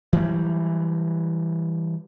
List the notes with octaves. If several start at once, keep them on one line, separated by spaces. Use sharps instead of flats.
E3 F#3 G3